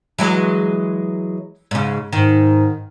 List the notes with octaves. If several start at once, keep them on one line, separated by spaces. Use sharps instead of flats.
E3 F#3 G#3
G#2 C#3
G#2 D#3